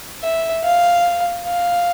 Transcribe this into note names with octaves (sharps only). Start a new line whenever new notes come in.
E5
F5
F5